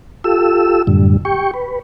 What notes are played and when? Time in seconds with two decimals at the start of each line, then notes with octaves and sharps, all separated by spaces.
0.24 F4 G4 A4 E6
0.87 F#2 A2 D3 G3
1.25 G4 G5 C#6
1.54 B4